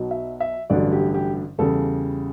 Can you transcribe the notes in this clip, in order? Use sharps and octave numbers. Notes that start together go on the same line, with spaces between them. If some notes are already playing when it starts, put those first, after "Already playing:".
Already playing: B1 B2 F#3
E5
E5
A1 G2 D3 F#3 D5
G4
G4
E2 C#3 G3 A4